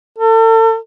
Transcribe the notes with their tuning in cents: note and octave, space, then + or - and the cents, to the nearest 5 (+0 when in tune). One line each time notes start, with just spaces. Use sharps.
A4 +35